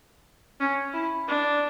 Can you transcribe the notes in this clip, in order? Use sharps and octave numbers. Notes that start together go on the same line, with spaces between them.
C#4
E4
D4